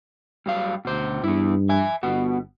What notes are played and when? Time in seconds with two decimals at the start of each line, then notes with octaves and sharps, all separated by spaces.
0.46 G2 F#3 F5
0.85 D2 B2 C5
1.23 G2 B3 E4
1.69 E5 G#5
2.03 G1 B3 F#4